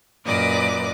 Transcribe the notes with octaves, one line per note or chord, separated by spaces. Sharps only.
F#2 A#2 B4 D5 D#5 D6